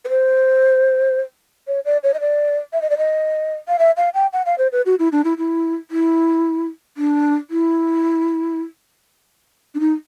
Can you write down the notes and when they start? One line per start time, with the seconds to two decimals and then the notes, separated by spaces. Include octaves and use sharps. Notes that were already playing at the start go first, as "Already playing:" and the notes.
0.05 B4
0.09 C5
1.68 C#5
1.85 D5
2.03 C#5
2.14 D#5
2.20 D5
2.73 E5
2.82 D#5
2.90 D5
2.98 D#5
3.68 F5
3.79 E5
3.97 F5
4.14 G5
4.33 F#5
4.46 F5
4.58 C5
4.72 B4
4.86 F#4
4.99 E4
5.12 D4
5.24 E4
5.38 E4
5.91 E4
6.97 D4
7.50 E4
9.75 D4
9.80 D#4